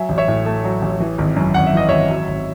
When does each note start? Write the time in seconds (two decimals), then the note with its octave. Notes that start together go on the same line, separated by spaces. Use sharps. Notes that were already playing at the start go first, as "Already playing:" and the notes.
Already playing: F#3 E5 G#5
0.09 A1
0.18 C#5 E5
0.28 A2
0.46 A3
0.64 F#3
0.82 A1
1.00 E3
1.18 G#1
1.36 F#2
1.54 G#1 F#5
1.66 E5
1.73 E3 D#5
1.89 G#1 C#5 E5
2.10 F#3
2.28 G#1